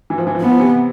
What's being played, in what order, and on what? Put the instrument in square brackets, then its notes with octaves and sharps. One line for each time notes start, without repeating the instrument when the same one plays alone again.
[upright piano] E3
F3
E3
F3
[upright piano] E3 [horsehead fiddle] B3
[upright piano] F3
C3 E3